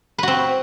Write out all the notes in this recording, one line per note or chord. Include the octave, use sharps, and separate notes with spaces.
C4 F#4 B4